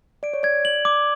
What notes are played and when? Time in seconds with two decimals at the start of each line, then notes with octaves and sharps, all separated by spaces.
0.23 D5 D7
0.34 C#5
0.43 D5 G#6
0.65 F#7
0.85 D6